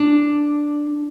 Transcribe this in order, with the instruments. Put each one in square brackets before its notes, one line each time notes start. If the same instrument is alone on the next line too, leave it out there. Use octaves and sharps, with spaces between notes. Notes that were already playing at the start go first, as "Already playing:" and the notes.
Already playing: [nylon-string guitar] D4